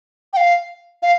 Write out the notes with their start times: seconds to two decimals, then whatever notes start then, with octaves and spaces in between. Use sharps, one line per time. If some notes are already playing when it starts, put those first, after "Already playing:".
0.33 G5
0.37 F5
1.02 F5